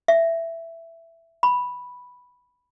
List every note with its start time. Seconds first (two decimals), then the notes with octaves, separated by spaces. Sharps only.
0.08 E5
1.43 B5